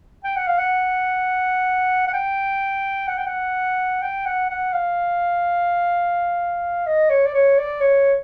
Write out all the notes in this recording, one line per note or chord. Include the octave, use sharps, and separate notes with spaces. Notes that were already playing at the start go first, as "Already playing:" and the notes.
G5
F#5
F5
F#5
F#5
G5
F#5
G5
F#5
G5
F#5
F#5
F5
D#5
C#5
D5
C#5
D5
C#5